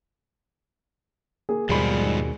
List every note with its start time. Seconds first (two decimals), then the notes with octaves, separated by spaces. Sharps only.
1.49 A#3 G#4
1.69 D#2 G#2 B2 F3 G3 G#4 B5